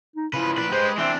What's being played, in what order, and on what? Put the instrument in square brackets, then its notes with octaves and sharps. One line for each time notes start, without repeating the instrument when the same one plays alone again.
[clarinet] D#4
[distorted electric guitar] C#3 F3 [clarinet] E4 [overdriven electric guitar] B4
[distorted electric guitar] A#2 D4 [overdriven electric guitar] B4
[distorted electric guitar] G#3 [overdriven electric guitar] G4 B4 [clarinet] C5
[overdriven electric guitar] E3 D4 [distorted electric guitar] C4 [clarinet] E5